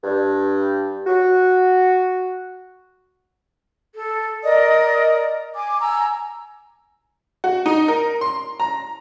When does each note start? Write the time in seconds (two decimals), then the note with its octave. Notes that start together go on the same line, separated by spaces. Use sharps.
0.04 G2
1.07 F#4
3.96 A4
4.43 A#4 D5 D#5 D#6
5.55 G#5 D6
5.81 G#5 A#5 E6
7.44 F#4
7.66 D#4
7.88 A#4
8.21 C6
8.60 A#5